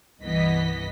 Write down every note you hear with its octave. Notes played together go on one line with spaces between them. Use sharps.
C2 G2 E3 B3 D#5 B6